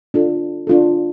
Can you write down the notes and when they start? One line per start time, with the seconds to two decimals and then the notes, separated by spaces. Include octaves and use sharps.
0.14 D4 F4 A4
0.67 D4 F4 A4